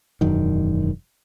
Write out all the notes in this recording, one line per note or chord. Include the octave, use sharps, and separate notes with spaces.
E1 F#2 D#3